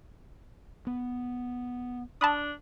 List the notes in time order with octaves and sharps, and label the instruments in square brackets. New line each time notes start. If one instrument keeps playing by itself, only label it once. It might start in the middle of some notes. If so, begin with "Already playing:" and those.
[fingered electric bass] B3
[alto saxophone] D4 [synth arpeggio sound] A5 B5 D#6